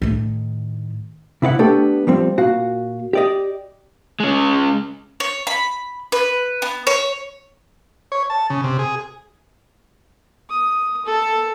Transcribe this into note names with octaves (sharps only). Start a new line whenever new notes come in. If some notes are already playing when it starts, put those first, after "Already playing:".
A2 D#3
C3 E4 D5 F#5
A3 B3 D4 G4 A4
F3 G3 C4
A#2 F#4 F5
G4 D5 D#5
G#3 C#4
C#5
B5
B4
B3
C#5
C#5
A5
C#3
C3
G#4
D#6
A4